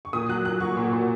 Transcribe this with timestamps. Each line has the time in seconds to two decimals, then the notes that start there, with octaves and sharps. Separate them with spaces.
0.05 C#6
0.13 A#2 D#6
0.29 F#3 F#6
0.45 F#3 F#6
0.60 F#3 C#6
0.77 A#2
0.93 A#2